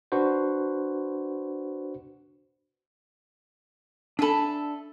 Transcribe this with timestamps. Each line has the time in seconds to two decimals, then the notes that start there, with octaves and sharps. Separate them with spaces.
0.12 D4 F#4 B4 C5
4.19 D4 A4 E5 G#5 B5